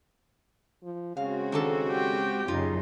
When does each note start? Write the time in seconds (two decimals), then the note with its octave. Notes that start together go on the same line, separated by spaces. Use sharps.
0.83 F3
1.17 C#3 G#3 C4 F#4 F5
1.52 D#3 D4 A4
1.88 G4 G5
2.48 F#2 C#3 D#4 F4